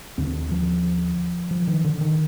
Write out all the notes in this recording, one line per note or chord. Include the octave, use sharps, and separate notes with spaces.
D#2 D3 C4
F3
F3
D#3
D3
D#3